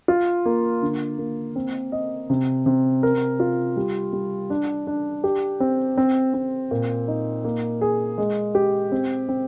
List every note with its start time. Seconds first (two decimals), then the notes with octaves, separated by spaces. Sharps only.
0.08 F4
0.46 A#3
0.82 D3
1.18 A#3
1.56 C4
1.92 D#5
2.30 C3
2.66 C3
3.03 A#4
3.40 F4
3.77 G3
4.13 G3
4.50 D4
4.87 D4
5.24 G4
5.60 C4
5.98 C4
6.34 C4
6.71 A#2
7.08 D#4
7.44 A#3
7.81 G#4
8.18 G#3
8.55 G4
8.92 C4
9.29 C4